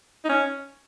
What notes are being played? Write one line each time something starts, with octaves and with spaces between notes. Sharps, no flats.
D#4
C#4